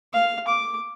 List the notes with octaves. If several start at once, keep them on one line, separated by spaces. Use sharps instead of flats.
F5
D6